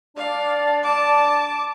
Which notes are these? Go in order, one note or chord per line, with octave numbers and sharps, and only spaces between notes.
D4 D5 F5
A5 D6